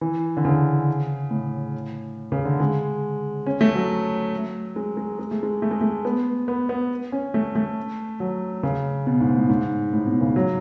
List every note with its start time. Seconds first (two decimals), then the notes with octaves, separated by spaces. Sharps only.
0.01 E3
0.37 D3
0.45 C#3
1.31 A2
2.32 C#3
2.45 D3
2.60 G#3
3.46 C#4
3.61 A3
3.75 F#3
4.76 G#3
4.97 G#3
5.19 G#3
5.31 A3
5.43 G#3
5.62 A3
5.71 G#3
5.81 A3
6.05 B3
6.48 B3
6.69 B3
7.12 C#4
7.34 A3
7.55 A3
8.20 F#3
8.63 C#3
9.07 B2
9.21 G#2
9.35 A2
9.49 G#2
9.93 A2
10.07 B2
10.21 C#3
10.36 F#3